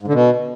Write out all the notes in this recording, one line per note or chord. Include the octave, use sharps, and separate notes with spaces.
G#2
D3
B2